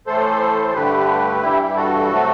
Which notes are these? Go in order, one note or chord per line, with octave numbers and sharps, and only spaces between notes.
A2 E3 A3 A4 C5
A4
G2 D3 A3 G4 B4
G2 E3 G3 E4 G4
G4
F#4 A4
C3 F#3 A3